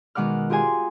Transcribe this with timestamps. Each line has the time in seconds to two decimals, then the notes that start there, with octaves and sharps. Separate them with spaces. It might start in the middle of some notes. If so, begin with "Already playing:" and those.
0.15 B2 D#3 G#3 F#5 D6 F6
0.50 F4 G4 G#4 G#5 C6